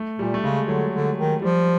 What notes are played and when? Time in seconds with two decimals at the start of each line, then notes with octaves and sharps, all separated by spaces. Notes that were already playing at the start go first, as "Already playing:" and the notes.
Already playing: A3
0.19 A#2 G3
0.34 A3
0.43 C#3 G#3
0.68 D3 F#3
0.94 D3
1.18 D#3
1.42 F3 G3